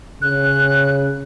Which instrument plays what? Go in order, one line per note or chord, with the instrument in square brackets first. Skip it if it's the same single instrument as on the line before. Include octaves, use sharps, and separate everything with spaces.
[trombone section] C#3 [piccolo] F#6